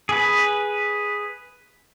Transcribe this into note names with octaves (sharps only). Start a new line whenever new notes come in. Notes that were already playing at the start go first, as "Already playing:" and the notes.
G#4 B4